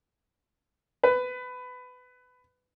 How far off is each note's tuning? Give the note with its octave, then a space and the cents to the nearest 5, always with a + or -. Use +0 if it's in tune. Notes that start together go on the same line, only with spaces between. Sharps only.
B4 +20